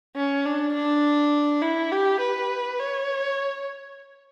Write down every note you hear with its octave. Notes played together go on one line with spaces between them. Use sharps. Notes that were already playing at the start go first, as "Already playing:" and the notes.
C#4
D4
D4
E4
G4
B4
C#5